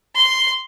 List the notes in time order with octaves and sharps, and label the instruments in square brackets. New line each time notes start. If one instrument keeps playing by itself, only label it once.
[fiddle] C6